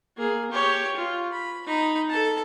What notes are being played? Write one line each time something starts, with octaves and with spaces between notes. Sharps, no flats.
A#3 G#4
G4 C#5
F4
B5
D#4 B5
A4 A5